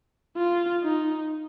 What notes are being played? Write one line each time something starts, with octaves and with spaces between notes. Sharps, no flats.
F4
D#4